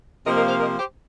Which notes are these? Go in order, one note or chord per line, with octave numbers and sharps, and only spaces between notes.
C3 F3 A#3 A#4 D#5
A#4 D#5
C5 F5
A#4 D#5
G4 C5